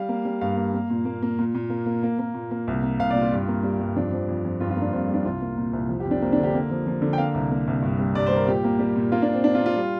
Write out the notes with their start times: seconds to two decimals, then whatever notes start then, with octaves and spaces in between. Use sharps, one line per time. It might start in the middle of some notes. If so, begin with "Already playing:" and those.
Already playing: G3 F5
0.09 A#3
0.25 G3
0.41 G2 F5
0.57 A#3
0.74 A#3
0.90 A#2
1.05 A#3
1.22 A#3
1.39 A#2
1.55 A#2
1.70 A#3
1.86 A#3
2.03 A#3
2.19 A#3
2.34 A#2
2.51 A#3
2.67 C2
2.83 A#3
2.99 C2 F5
3.10 D5
3.15 A#2
3.21 F4
3.32 G2
3.48 A#3
3.63 G3
3.79 G2
3.96 F2 D4
4.12 F3
4.29 F2
4.45 F2
4.60 G2 F4
4.71 F4
4.76 A#3
4.82 D4
4.92 G2 C4
5.08 G3
5.14 D4
5.25 C2 F4
5.42 A#3
5.57 A#2
5.73 C2
5.89 F2
6.00 G4
6.05 F2
6.11 D4
6.22 A#3 C4
6.33 D4
6.38 D3
6.43 G4
6.55 A#3
6.70 F3
6.87 F3
7.02 D3
7.13 G5
7.18 A#3 F5
7.34 C2
7.51 A#3
7.67 C2
7.82 G2
7.99 G3
8.15 G2 D5
8.26 C5
8.31 G3
8.36 A#4
8.47 A#2 G4
8.64 A#3
8.79 G3
8.96 A#2
9.12 A#3 F4
9.22 D4
9.28 A#3
9.33 C4
9.44 A#3 D4
9.55 F4
9.60 A#3
9.66 F4
9.76 G3